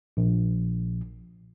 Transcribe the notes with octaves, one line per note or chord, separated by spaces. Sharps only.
A#1